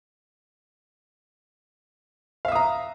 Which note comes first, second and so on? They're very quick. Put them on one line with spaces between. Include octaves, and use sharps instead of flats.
F5 E5 D#6 A#5